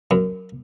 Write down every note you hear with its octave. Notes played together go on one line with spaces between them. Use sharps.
F#2